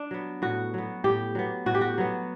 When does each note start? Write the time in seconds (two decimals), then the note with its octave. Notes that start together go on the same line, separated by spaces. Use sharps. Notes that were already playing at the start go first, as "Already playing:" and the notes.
Already playing: D4
0.11 F#3 B3
0.42 A2 F#4
0.74 F#3 B3
1.04 A2 G4
1.35 F#3 B3
1.66 A2 F#4
1.75 G4
1.81 F#4
1.98 F#3 B3